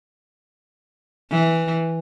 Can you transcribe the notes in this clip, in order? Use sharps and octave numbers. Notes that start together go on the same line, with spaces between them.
E3